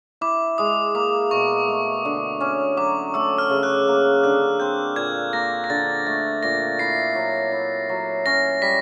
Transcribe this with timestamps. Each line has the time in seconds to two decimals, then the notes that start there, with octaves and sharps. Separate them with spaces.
0.21 E4 D6
0.58 G#3 D#6
0.94 A#3 D6
1.31 B2 C#6
1.68 A3
2.05 D3
2.40 C#4 D6
2.77 F#3 D6
3.14 A3 E6
3.38 F6
3.50 C#3
3.63 F#6
3.88 A#3
4.24 D3 F#6
4.60 C4 G6
4.96 A#2 G#6
5.33 A#3 A#6
5.64 A#6
5.70 D3 A6
6.06 A3 A6
6.43 A#2 A#6
6.79 E4 C7
7.15 F#3
7.52 E4
7.89 F#3
8.26 C#4 A#6
8.62 G3 B6